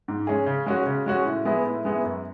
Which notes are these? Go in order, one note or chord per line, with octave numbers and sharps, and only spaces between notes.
G#2
G#3 C#4 G#4
C#3
G#3 C#4 F#4
C#3
G#3 C#4 F#4
A2
G#3 B3 E4
A2
G#3 B3 E4
F#2